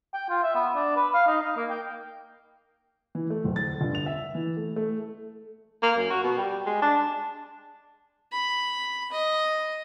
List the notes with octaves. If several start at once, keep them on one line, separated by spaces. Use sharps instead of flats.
G5
F4
E5
B3
D4
B4
F5
D#4
D#4
A#3
G5
E3
A3
D1
A6
G1
F7
E5
E3
A3
A3
A#3
F#2
F#4
B2
G3
G#3
D4
B5
D#5